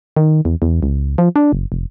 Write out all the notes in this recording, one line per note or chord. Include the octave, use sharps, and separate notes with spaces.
D#3
E2
E2
C#2
F3
D4
F#1
F1